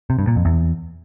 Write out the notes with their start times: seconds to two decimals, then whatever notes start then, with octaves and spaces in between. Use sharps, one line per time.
0.10 C3
0.19 G2
0.27 A#2
0.36 F2
0.45 E2